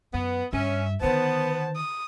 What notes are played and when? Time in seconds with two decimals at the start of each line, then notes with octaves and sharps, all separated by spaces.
0.14 F#2 B3
0.53 G2 C#4 E5
1.01 D3 D#3 B3 C5 A5
1.76 D#6